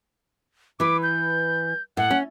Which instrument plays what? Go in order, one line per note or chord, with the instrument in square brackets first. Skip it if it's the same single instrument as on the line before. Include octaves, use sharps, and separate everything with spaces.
[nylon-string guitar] E3 B4 [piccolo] D6
[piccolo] G6
[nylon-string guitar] A2 [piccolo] F#5
[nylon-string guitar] C#4